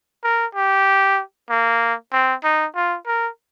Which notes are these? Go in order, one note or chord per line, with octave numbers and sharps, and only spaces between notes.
A#4
G4
A#3
C4
D#4
F4
A#4